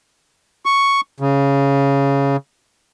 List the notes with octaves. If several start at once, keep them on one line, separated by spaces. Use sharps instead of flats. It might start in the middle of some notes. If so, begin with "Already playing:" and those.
C#6
C#3